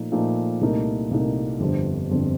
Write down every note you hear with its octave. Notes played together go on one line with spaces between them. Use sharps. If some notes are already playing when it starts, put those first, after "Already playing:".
Already playing: A#2 F3 A3 D#4
A#2 F3 A3 D#4
C2 A#2 A3 D#4 A#4
C2 A#2 A3 D#4 A#4
G1 F2 D3 G3 C4
G1 F2 D3 G3 C4